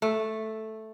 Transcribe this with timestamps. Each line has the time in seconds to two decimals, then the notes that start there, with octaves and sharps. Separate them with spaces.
0.02 A3